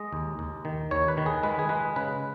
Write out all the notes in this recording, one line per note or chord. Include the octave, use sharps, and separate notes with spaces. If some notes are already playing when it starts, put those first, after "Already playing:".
Already playing: G#3 D#5
D#2
D#2
D#3
D#2 C#5
B4
D#3
G#4
G#3 B4
G#4
G#3 B4
C#3 B4